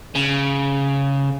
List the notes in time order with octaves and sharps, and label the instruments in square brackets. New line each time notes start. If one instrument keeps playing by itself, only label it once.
[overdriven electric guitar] C#3